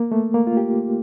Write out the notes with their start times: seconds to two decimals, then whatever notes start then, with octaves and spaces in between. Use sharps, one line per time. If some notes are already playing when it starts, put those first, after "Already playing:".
Already playing: A#3
0.12 A3
0.34 A#3
0.47 F4
0.57 G4